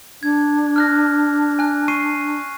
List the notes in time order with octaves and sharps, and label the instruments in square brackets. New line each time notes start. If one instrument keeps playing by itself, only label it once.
[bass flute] D4 [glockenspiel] G#6
[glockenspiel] F6 F#6 A#6
G#5 F#6
C#6 C7 D#7